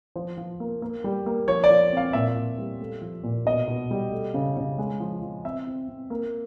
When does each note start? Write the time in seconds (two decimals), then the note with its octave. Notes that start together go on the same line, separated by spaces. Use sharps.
0.16 F3 C5
0.38 F3
0.60 A#3
0.82 A#3
1.04 G3
1.26 A#3
1.47 F3 C#5
1.64 D5
1.70 F3
1.92 C4 F5
2.13 A#2 E5
2.36 A#2
2.58 G3
2.80 A3
3.01 F3
3.23 A#2
3.46 B2 D#5
3.68 B2
3.91 G3
4.12 A3
4.34 C#3
4.57 C#3
4.78 G#3
5.00 F3
5.22 F3
5.45 C4 E5
5.67 C4
5.89 C4
6.10 A#3